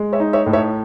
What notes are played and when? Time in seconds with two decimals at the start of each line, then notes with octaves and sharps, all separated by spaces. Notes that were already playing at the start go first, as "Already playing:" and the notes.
Already playing: G#3
0.13 C#5 E5
0.20 D#4
0.33 C#5 E5
0.46 A2
0.53 C#5 E5